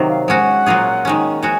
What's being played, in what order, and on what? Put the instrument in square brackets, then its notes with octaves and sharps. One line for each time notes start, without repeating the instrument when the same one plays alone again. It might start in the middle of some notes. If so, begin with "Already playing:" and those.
Already playing: [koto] C3 D#3 F#3
[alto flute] F5
[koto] G#3 C#4 F#4 [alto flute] F#5
[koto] A#2 F#3 A#3 F4 G#4
D#3 G#3 C#4
[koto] G#3 C#4 F#4 [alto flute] G#5